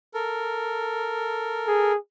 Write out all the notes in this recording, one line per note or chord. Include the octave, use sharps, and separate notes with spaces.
A4 A#4
G#4